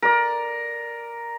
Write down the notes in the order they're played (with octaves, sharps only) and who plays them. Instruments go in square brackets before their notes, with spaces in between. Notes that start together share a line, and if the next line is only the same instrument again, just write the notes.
[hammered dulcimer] A#4 D5